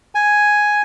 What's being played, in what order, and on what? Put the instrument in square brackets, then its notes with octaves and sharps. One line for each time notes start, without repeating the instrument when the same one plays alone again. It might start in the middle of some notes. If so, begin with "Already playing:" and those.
[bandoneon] G#5